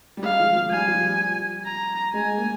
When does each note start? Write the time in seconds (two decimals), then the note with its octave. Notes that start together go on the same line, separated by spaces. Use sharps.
0.17 G3
0.23 G#3 F5
0.40 F3
0.55 F3
0.70 G3 G#5
0.87 F3
1.02 G3
1.66 A#5
2.13 G#3 G#5
2.37 A#3